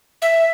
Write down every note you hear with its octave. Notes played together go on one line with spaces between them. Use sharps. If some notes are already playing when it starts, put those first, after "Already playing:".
E5